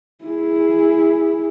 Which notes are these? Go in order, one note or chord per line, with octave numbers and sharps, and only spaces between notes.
E4 G#4